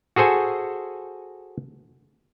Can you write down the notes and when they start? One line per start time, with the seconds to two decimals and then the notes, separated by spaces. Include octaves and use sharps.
0.16 F#4 G#4 A4 C5 G#5